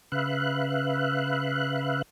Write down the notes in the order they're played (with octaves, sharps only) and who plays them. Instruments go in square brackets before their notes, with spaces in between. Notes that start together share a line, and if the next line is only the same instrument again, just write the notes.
[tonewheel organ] C#3 B4 E5 F5 F#6